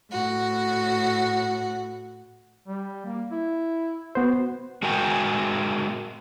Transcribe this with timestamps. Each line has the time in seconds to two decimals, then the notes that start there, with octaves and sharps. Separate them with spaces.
0.11 A2 F#4
2.68 G3
3.06 A#3
3.32 E4
4.15 B3 F#4 C5
4.82 G#3 F#4 A#4 G5 G#5